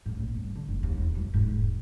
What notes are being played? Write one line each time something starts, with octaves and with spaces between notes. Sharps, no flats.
A2
A#1
G2
D3
F#1
D#2
E1
F#2
G#2
E1